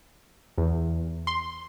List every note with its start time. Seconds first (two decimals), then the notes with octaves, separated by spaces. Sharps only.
0.58 E2
1.27 C6